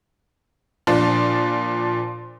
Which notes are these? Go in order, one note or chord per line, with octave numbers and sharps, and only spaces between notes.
A#2 F3 D4 F4